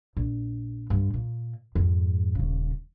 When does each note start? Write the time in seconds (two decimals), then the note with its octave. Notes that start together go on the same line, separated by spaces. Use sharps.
0.17 A#1
0.90 G2 D3
1.14 A#2
1.75 F2 G#2
2.35 D#1 C#3